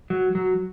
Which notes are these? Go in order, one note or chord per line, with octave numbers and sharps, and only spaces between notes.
F#3
F#3